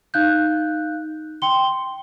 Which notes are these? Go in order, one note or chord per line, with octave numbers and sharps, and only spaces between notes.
D#4 F5 F#6 G6
G5 C6 G7